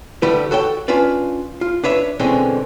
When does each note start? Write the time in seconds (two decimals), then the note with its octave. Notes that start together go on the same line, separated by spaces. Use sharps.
0.22 D3 G3 A3 E4 B4
0.51 F#4 A4 C#5 G5
0.88 C#4 D4 F4 B4 D5
1.61 F4
1.84 D4 B4 C#5 E5
2.19 B2 D3 E3 G#3 C4 C#4